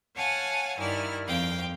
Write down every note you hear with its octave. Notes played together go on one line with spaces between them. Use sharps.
C#5 F5 F#5 G#5 A5
G2 D#3 E4 D5 F6
F2 F5 G5